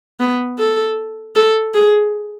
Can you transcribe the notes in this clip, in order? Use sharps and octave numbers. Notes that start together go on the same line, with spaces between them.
B3
A4
A4
G#4